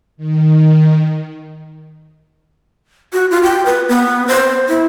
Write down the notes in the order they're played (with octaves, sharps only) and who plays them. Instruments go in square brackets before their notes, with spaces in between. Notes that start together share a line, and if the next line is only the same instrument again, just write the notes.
[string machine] D#3
[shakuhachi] F#4
F4
G5
B4
B3
C5
E4